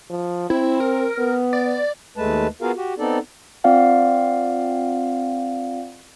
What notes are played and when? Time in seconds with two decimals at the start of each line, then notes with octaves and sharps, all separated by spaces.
0.10 F3
0.50 C4 E4
0.80 A#4
1.18 B3
1.53 D5
2.17 D#2 G#3 A3 B4 A5
2.62 B3 F4 F#4 G#4 A#4 F5
2.76 F#4 G4
2.99 B3 C4 D#4 A4 D5
3.64 C4 F4 D5 F5 F#5